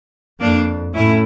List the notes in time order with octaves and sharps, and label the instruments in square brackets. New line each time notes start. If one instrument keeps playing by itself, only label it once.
[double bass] F2 [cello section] A#3 D4
[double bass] A2 [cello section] C#4 E4